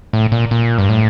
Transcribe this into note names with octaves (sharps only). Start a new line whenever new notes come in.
A2
A#2
A#2
G2
A2